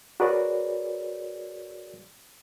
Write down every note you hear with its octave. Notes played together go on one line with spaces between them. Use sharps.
F#4 G#4 A#4 B4 C#5 D5